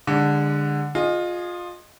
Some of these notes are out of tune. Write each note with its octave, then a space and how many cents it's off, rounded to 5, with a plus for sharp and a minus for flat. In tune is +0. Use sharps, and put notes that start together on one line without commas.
D3 +0 G#3 -35
F4 +20 G#4 +0 D#5 -20